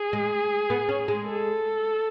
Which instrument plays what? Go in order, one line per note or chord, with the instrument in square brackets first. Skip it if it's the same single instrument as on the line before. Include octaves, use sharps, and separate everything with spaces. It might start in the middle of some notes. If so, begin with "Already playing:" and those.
Already playing: [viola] G#4
[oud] G#3
B3
C#4
G#3
[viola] A4